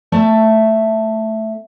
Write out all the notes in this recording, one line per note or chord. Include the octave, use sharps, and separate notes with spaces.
A3 D5 E5 A5